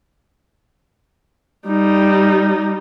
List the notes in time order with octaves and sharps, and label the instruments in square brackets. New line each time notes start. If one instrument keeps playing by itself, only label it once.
[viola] G3 D#4